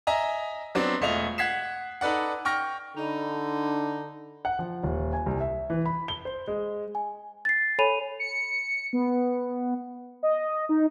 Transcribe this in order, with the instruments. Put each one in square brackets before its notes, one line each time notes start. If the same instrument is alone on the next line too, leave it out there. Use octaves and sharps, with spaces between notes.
[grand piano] D#5 E5 G#5 A#5 D#6
F#3 B3 C4 D4
E1 A3 F4 D#5 F7
F#5 G#6 B6 C7 E7
D#4 A4 B4 D5 F#5
G5 C#6 F6 A#6
[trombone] D3 [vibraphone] D4 D#5 B5 [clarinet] D#4
[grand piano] F#5
F3
D#1
G#5
C2
E5
E3
B5
G7
C5
G#3
[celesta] G#5
A6 C7
A4 C#5 G#5 B5 D#7 F7
[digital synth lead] C#7
B3
D#5
D#4